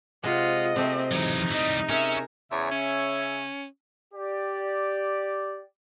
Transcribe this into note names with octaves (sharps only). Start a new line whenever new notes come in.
C3 G#3 F4 D#5 F#5
C3 A3 C4
E3 F#3 D#4
E3 G3 D#5
C#4 G#4 A#4 E5
E2 C#3 C#5 E5
C#4
G4 D5